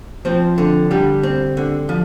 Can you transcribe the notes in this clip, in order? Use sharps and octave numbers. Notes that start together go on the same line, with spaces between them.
F3 C4 C5
D3
D3 G3 G4
C4
D3
F3